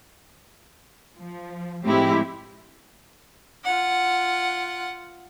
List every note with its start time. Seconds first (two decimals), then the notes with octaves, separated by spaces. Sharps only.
1.19 F3
1.84 A2 F3 G#3 C4 E4 G4
3.64 F4 F#5